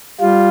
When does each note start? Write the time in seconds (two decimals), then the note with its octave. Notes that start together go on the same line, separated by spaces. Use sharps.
0.20 G3 F4